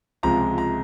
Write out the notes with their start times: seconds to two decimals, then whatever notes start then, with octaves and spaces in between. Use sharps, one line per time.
0.23 C#2 C3 F3 G#3 A#5
0.58 A#5